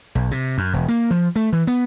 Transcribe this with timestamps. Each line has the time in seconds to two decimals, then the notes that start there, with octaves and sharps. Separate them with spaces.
0.15 B1
0.31 C3
0.58 F#2
0.73 E1
0.88 A#3
1.11 F3
1.36 A3
1.53 E3
1.67 B3